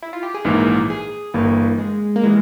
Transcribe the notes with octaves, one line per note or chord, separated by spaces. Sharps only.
E4
F4
G4
G#4
A#1 G#2 E3 A#3 A#4
G#4
G1 G2 E3 A#3
G#3
A#3
E3 G3 G#3